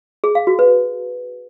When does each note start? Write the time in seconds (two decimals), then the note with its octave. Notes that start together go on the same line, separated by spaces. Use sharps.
0.24 G#4
0.35 F5
0.47 F#4
0.59 B4